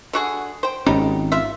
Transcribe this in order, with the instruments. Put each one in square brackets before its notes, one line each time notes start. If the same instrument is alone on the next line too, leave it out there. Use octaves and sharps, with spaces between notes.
[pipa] D3 F#4 G#4
C5 G5
[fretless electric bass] G#1 C#4 [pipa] G3 D#4 G4
[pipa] F4 E5